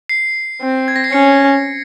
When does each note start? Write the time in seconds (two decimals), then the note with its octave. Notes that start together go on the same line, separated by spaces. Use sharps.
0.09 C7
0.61 C4
0.88 G#6
0.96 A#6
1.04 C7
1.12 C#4 C#7